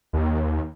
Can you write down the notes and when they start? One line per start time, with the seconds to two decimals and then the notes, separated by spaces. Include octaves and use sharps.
0.13 D#2